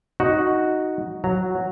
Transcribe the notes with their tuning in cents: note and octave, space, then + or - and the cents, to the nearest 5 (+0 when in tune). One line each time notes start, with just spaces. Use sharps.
D#4 +0 F#4 +0
F#3 +0 A#5 -10